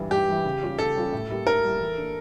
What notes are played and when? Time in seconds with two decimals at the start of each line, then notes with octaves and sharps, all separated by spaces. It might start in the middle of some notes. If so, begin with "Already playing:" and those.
Already playing: G2 E3 G3
0.11 G2 G4
0.28 E3 G3
0.44 C#3
0.62 G3 C#4 F4
0.79 C#3 A4
0.96 G3 C#4 F4
1.13 A2
1.30 G3 A#3 E4 G4
1.47 A2 A#4
1.64 G3 A#3 E4 G4
1.81 E3
1.98 A#3 D4